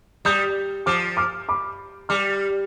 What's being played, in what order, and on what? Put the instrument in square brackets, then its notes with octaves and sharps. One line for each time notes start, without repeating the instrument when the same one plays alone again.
[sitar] G3 [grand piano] D#6 G6
[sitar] F3 [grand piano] D6 F6
[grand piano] D6 F6
B5 D6
[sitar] G3 [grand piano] D6 F6